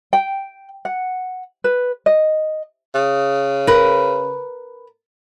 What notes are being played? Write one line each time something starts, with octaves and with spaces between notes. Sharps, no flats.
G5
F#5
B4
D#5
C#3
A#4 B4